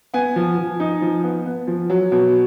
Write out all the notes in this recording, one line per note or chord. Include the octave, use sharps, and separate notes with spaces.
B3 G#5
F3
F3
D#4
F3
B3
B3
F3
F#3
B2